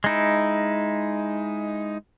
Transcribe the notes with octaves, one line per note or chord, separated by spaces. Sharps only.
G#3 D#4 E4